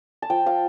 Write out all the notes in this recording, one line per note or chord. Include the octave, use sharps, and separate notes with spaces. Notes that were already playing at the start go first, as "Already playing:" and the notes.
A5
F3 G5
F3 F5